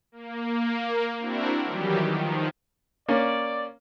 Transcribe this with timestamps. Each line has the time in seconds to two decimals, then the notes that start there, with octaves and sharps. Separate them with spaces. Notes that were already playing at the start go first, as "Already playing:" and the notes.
0.12 A#3
1.19 C4 D4 E4 F#4 A#4
1.64 D#3 E3 F#3 G3 G4
2.04 D#3 F3
3.09 A#3 C#4 D5